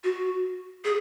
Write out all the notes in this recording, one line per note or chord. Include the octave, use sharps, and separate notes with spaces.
F#4
G#4